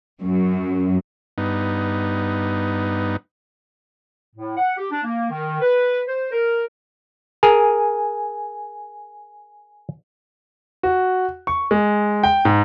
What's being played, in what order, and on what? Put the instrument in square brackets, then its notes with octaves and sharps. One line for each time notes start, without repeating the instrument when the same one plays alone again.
[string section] F#2
[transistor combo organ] G2 B3 D#4
[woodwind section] A2
F#5
G4
D4
A#3
D#3
B4
C5
A#4
[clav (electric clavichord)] G#4 A#4 [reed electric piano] G#5
[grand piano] F#4
C#6
G#3
G5
G#2